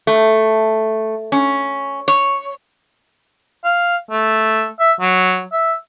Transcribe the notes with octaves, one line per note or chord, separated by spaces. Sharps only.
A3
C#4
C#5
F5
A3
E5
F#3
E5